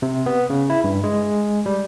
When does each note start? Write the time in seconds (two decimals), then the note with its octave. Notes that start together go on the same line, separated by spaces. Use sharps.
0.02 C3
0.26 B3
0.50 C#3
0.70 E4
0.84 G2
1.04 G#3
1.66 G3